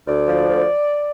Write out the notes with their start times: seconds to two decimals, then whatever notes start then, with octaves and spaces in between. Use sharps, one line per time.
0.07 D2 D5
0.27 F3
0.48 D2